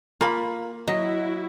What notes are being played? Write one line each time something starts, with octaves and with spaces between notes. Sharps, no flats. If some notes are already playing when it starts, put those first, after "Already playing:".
A#3 F4 B5
F#3 E4 F#4 D#5